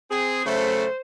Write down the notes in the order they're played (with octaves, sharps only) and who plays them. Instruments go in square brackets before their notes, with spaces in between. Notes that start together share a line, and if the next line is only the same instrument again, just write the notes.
[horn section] C4 G#4
[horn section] C#3 F#3 A3 [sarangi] C5